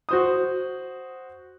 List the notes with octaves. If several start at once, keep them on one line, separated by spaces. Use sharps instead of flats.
F#4 C5 D#6